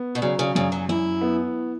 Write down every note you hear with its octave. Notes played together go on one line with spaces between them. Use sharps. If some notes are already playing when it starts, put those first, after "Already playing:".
Already playing: B3
B2
C#3 F#3
C#3
F#2 C#3
F#3
F#2 E4
B3